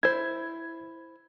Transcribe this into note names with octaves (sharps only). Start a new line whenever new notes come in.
E4 C5 G#6